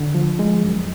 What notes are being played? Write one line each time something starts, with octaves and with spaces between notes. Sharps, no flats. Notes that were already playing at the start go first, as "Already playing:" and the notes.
Already playing: D3
F3
G#3
F#2